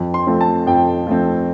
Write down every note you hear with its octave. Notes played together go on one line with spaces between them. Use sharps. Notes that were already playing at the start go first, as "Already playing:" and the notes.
Already playing: F2
C6
F3 A3 C4
A5
F2 G5
F3 A3 C4